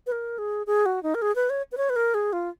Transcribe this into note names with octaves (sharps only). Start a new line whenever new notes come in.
B4
A#4
G#4
G#4
F#4
D#4
A#4
G#4
B4
C#5
B4
C#5
B4
A#4
G#4
F4